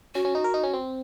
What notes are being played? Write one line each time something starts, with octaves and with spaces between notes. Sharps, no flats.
C#4 F#4
C#4
D#4
A#4
D#4
C#4
C4